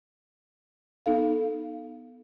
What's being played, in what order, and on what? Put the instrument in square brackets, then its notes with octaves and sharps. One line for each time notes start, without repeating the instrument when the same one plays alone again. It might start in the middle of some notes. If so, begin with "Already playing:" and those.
[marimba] B3 D#4 A4 F5